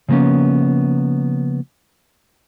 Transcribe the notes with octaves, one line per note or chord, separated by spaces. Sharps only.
C#3 F3 A#3 B3 C#4